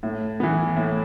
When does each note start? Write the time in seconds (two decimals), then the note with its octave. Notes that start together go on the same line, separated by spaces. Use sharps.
0.03 A2
0.40 E3 B3
0.76 A2